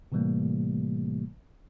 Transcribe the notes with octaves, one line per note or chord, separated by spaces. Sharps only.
A2 C3 E3 G3 A3 A#3